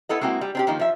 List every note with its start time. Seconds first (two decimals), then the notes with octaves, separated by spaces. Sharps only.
0.09 B3 E4 A4 D#5
0.21 G#3 A#3 C4 E4 F#4
0.41 G3
0.55 C4 D4 G4
0.67 D#3 F3 A#3 D#4
0.79 F3 E5